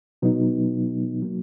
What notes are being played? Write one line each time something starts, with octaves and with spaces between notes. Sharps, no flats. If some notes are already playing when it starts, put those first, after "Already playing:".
B2 F#3 B3 D#4
F#3 A#3